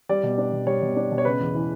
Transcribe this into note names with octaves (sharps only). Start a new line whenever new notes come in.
G3 D5
B2
D4
B2
G3 C#5
B2
D4
B2
C#5
C#3 B4
E2
E3